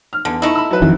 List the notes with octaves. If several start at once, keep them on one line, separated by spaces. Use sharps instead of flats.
F6
E2 D3
A3 D#4 E4
B5 E6
F#3 B4
F2 D#3 E3